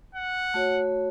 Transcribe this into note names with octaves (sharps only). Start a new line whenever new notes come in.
F#5
A3 F#4 C#5